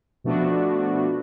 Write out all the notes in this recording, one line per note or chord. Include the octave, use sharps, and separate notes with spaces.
B2 F3 A3 B3 D4 F#4